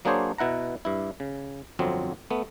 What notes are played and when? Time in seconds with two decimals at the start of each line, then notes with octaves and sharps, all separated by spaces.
0.05 F#3 A#3 D4 G#4 C5 C#5
0.38 B2 E4 F#5 A#5
0.85 G2 E4
1.20 C#3
1.79 G1 F2 F#3 C4
2.31 A3 B3